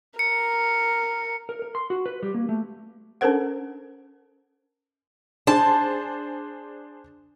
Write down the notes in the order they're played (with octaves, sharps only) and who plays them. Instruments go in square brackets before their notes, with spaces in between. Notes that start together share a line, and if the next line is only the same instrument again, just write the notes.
[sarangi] A#4 [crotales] C#7
[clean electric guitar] A#4
A#4
C6
F#4
B4
G3
A#3
A3
[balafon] C#4 D4 A4 A#4 C5 F#5
[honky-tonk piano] D4 G#4 C5 [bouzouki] A5